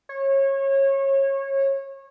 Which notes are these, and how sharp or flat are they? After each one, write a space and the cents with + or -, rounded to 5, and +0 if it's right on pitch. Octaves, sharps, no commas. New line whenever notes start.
C#5 -25